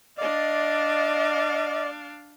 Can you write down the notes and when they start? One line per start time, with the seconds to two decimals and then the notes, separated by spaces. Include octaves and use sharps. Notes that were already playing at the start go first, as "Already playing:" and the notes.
0.18 D4 D5 D#5 F5